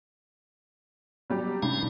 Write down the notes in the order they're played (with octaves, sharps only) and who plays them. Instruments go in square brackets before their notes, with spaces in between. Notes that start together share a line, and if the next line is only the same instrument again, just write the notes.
[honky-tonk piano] F#3 G3 G4
[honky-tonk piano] G2 [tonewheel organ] C3 C#4 D#4